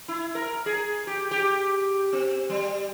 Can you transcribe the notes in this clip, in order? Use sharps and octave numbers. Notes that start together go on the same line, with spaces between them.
E4
A#4
G#4
G4
G4
C4
G3